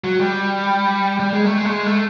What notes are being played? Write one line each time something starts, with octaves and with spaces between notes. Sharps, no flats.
F#3
G3
G3
G#3
A3
G#3
A3
G#3
A3